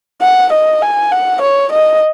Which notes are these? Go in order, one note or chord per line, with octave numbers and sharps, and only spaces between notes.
F#5
D#5
G#5
F#5
C#5
D#5